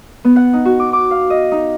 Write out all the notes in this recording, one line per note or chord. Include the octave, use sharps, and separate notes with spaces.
B3
F#5
D#4
F#4
D6
D6
F5
D#5
D#4